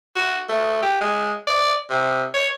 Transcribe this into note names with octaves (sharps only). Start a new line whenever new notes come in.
F#4
A3
G4
G#3
D5
C3
C#5